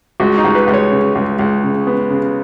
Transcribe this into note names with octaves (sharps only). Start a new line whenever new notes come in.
C#2 F#4
D#4
C#2
B4
C#2
C#5
C#3
C#2
C#2
C#3
B3
C#3